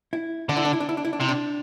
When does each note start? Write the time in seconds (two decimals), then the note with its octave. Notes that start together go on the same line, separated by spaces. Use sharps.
0.13 E4
0.49 D3 D4
0.57 E4
0.65 D4
0.73 E4
0.80 D4
0.89 E4
0.97 D4
1.05 E4
1.13 D4
1.20 C3 E4
1.29 D4